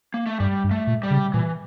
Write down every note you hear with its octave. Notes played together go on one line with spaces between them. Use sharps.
A#3
A3
G2 G3
G2
A3
A#2
G3
C#3
A#2 E3